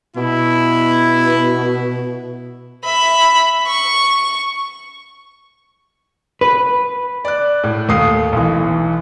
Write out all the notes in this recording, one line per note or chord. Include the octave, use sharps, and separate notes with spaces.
B2 E4
E5 B5
C#6
B4
D5 F#6
A2
D#2 A3 D#6 C7
B1 E3